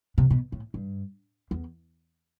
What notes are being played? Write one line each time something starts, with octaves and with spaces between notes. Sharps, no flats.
C3
B2
A2
G2
E2